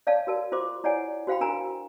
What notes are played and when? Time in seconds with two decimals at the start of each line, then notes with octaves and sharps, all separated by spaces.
0.07 C#5 D5 F5 A5
0.27 F#4 A#4 A5
0.52 F4 C5 C6 D6
0.84 E4 C#5 D5 F#5 G#5
1.27 F#4 C5 F5 G5 B5
1.41 D4 F#4 A#4 G#5 A#5